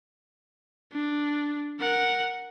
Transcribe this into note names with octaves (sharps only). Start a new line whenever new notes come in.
D4
A#4 F#5